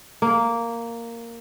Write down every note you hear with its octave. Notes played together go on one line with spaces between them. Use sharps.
A#3